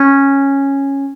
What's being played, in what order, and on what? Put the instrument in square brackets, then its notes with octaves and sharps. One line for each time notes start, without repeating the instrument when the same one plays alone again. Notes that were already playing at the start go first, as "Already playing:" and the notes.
Already playing: [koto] C#4